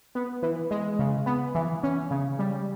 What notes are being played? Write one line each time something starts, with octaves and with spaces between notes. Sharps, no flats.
B3
E3
G#3
C#3
B3
E3
C#4
C#3
G3